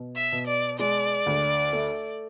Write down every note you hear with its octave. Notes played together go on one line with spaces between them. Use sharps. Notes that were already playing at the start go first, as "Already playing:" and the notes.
Already playing: B2
E5
B2
D5
G#3 D5
D2
A3